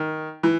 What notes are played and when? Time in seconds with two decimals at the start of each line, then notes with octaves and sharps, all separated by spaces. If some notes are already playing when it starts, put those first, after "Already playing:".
Already playing: D#3
0.43 E3